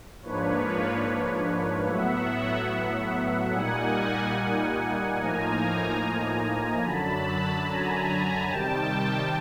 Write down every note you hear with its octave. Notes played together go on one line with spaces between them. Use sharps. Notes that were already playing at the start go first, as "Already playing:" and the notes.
G#2 F3 A#3 D4 B4 C#5
A2 F#3 B3 E5 F#5
A#2 G3 A#3 D#4 F#5 G#5
A2 F3 A#3 D#4 G#5 A#5
F#2 D3 F#3 A5 B5
G#5 A#5
C3 D#3 G3 G5 A5